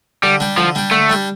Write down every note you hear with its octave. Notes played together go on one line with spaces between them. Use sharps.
D3 G3
G3 D4 G4
D3 F3
G3 D4 G4
D3 A3
G3 D4 G4